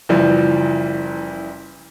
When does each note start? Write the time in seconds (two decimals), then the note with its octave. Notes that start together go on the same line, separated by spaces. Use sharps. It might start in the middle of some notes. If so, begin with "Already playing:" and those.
0.09 F#1 E3 F3 G3